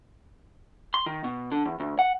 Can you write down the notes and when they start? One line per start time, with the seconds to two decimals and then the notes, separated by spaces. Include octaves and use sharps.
0.94 C6
1.06 D#3
1.24 B2
1.52 D3
1.65 E2
1.80 D2
1.99 F#5